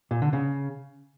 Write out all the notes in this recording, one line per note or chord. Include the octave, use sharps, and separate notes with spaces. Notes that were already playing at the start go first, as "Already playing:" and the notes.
A#2
D3
C#3